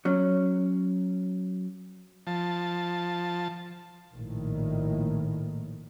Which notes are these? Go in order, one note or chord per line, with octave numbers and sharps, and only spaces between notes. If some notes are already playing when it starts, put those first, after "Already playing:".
F#3 C#4
F3 A5
A#1 A2 D#3